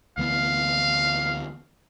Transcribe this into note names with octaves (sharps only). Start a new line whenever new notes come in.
D2 E3 B3 F5